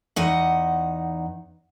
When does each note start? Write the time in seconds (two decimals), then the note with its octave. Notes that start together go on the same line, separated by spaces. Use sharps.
0.16 E2 D#4 F#5